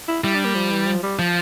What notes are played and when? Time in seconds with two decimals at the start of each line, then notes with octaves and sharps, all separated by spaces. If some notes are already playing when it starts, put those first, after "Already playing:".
0.08 E4
0.23 G3 E4
0.35 D4
0.45 A#3
0.55 F3
0.71 E3
0.86 F3
1.03 G3
1.19 F3